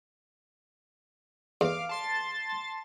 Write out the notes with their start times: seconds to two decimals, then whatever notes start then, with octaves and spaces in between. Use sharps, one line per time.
1.61 E2 F5 D6
1.89 A5 C6 A6